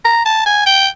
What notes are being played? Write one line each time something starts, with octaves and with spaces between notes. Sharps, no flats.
A#5
A5
G#5
G5